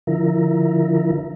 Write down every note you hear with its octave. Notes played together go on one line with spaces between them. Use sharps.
D3 F3 E4 A#4